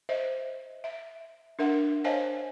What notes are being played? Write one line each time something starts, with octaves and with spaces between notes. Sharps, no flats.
C5 D#5 E5
E5
D4 A#4 E5 F#5
C5 C#5 D#5 F5 G#5 A5